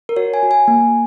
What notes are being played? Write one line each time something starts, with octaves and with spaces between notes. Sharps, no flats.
A#4
F#4 C#5
G#5
F#4
G#5
A#3